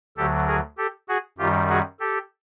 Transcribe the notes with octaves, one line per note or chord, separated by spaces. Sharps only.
D2 D3 F#3 G4 A4
G#4 A#4
G4 A4
F#4 G#4
F#2 D#3 G3 F4 G4
F#4 G#4
G4 A4